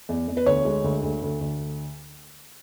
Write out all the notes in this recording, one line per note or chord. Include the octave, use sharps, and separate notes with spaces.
E2
E2
B4
D2 C#5
G#3
D2
D2
D2
D2